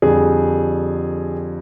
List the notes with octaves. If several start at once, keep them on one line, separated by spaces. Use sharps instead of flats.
F2 D3 G3 G#4